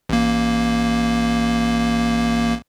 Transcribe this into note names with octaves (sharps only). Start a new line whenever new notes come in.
A1 A#3